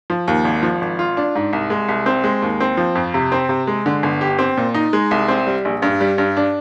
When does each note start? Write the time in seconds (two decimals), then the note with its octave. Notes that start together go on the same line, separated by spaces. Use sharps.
0.10 F3
0.28 D#2
0.45 G#1
0.63 F3
0.81 G#1
0.99 F4
1.17 D4
1.35 G#2
1.53 C2
1.70 G#3
1.89 C2
2.06 C4
2.24 G#3
2.42 D#2
2.60 C4
2.77 F3
2.95 F2
3.14 C3
3.32 C4
3.49 C3
3.67 G#3
3.86 D3
4.03 G1
4.21 G4
4.39 C4
4.57 A#2
4.74 D#4
4.93 G#3
5.11 C2
5.28 C4
5.47 G3
5.65 A#1
5.82 G2
6.01 G3
6.18 G2
6.37 D4